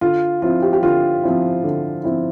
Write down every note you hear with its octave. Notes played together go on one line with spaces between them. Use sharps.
D3 F4
F3 C4 E4 F4
G4
G4
D3 F4
F3 C4 E4
D3
F3 C4 E4